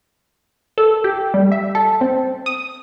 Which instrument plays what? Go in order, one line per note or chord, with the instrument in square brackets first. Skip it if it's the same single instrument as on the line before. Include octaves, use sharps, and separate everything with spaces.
[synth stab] A4
G4
G3
E5
A4
C4
D#6